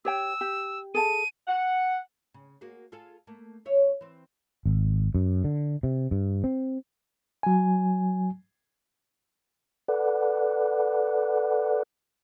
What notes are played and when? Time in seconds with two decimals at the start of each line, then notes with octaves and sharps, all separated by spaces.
0.05 G4 C#5 G5 E6
0.41 G4
0.94 G#4 A4 A5 D#7
1.47 F#5
2.34 C#3
2.61 A#3 F#4 G#4
2.92 F4 G#4 A4
3.27 A3 A#3
3.65 D#2 C#5 E5
4.01 E3 C4
4.66 G#1
5.15 F#2
5.44 D3
5.83 C3
6.11 G2
6.44 C4
7.43 F#3 G#5
9.88 A4 B4 D5 F#5